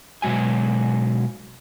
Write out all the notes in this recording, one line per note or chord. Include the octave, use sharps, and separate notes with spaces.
B2 F#3 G#3 F#4 G#5